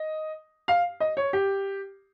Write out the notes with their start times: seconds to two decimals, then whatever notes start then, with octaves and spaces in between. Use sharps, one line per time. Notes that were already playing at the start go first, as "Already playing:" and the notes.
Already playing: D#5
0.68 F5
1.00 D#5
1.17 C#5
1.33 G4